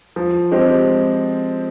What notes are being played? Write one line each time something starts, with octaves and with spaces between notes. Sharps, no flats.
F3
G#3 C4 G4 C5